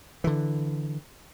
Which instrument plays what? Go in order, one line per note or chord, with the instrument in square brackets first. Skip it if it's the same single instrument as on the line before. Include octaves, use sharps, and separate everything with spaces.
[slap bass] D3 E3